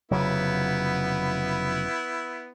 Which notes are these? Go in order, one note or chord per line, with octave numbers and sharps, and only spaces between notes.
F1 C#3 F#3 B3 E4